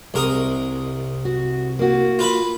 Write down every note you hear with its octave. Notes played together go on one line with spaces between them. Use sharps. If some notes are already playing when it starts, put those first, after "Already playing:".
C2 G#3 A#4 D#6
F#4
A#3 E4 F#4
F4 B4 B5